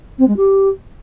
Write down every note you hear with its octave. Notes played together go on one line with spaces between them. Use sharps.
C4
G#3
G4